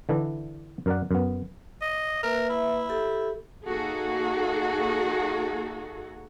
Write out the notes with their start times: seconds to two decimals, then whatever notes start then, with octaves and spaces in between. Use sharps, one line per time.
0.09 D3 E3 D4 E4
0.86 F#2 A#4 D5 F#5
1.11 F#2 B3
1.81 D#5
2.23 A#3 A#4 B4 E5
2.49 E4
2.89 G4 A4
3.65 A#3 D#4 F#4 G#4 A4